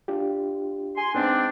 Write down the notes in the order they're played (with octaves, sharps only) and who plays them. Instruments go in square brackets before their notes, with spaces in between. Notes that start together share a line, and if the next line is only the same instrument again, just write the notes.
[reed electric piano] D4 F4 G4
[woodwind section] G#5 C6
[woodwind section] G#2 C4 D4 [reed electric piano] B3